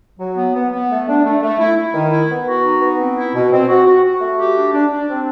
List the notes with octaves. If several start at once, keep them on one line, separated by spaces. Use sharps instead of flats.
F#3
B3
B3
B3
A3
D4
A3
A3
E4
E4
D#3
E4
B3
F#4
D#4
B3
C4
E4
B2
C4
F#4
F#4
F#4
A3
G4
D4
D4
D4
C4